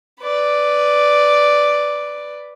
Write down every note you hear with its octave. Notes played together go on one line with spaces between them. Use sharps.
B4 D5